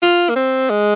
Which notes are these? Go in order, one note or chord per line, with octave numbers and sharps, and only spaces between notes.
F4
A#3
C4
G#3